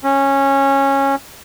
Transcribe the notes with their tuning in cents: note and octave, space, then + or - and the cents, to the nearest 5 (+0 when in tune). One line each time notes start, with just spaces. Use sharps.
C#4 -15